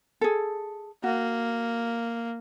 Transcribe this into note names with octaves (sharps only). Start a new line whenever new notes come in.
G#4 A4
A#3 F#4